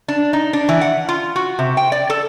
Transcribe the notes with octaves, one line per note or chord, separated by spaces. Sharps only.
D4
D#4
D4
E3
F#5
F4
F#4
C3
G5
D5
A4